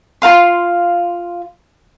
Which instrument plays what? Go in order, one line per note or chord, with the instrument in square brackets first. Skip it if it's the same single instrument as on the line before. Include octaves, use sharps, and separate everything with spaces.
[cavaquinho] F4 A#4 F5 C6